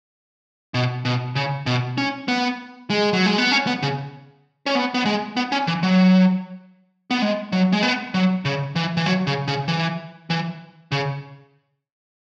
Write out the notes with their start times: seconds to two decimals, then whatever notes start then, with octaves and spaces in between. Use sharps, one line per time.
0.74 B2
1.05 B2
1.35 C#3
1.66 B2
1.98 C#4
2.28 B3
2.90 G#3
3.13 F#3
3.26 G#3
3.38 B3
3.52 C#4
3.67 B3
3.83 C#3
4.66 C#4
4.75 B3
4.94 B3
5.05 G#3
5.37 B3
5.52 C#4
5.67 E3
5.83 F#3
7.11 B3
7.22 G#3
7.52 F#3
7.73 G#3
7.83 B3
8.14 F#3
8.45 C#3
8.76 E3
8.97 E3
9.06 F#3
9.27 C#3
9.48 C#3
9.68 E3
10.30 E3
10.92 C#3